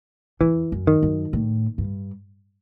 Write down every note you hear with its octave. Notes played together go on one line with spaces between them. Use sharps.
E2 E3
F#2
D#3
F#2
A2
G2